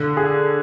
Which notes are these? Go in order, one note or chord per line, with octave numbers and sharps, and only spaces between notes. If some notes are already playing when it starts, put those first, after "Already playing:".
Already playing: D3
G#4